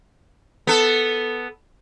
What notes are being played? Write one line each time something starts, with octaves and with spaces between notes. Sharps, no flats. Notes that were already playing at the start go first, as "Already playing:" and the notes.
B3 A4